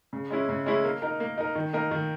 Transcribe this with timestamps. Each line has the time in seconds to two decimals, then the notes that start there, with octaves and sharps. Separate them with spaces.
0.13 C#3
0.30 G#3 C#4 E4
0.49 C#3
0.66 G#3 C#4 E4
0.84 A#3
1.02 D#4 A#4
1.20 A#3
1.38 D#4 A#4
1.55 D#3
1.73 A#3 D#4 A#4
1.91 D#3